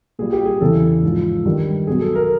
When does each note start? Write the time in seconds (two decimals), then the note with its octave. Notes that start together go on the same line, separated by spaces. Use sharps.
0.19 A#2 G3 G#4
0.33 G4
0.45 G#4
0.61 E2 C#3 E3 A4
1.03 G#2 F3
1.45 G2 D#3 G3
1.87 B2 F#3 G#4
2.01 A4
2.15 A#4